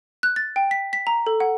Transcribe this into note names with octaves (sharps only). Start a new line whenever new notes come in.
F#6
A6
G5
B6
B6
A#5
A4
F#5